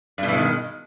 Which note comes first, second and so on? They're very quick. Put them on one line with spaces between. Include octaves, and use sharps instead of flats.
G2 B2 E3 G#3 D#3